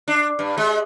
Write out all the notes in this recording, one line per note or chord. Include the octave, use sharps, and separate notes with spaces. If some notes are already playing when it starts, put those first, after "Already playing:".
D4
G2
G#3